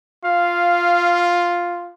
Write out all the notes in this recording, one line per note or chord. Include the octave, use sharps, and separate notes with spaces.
F4 F5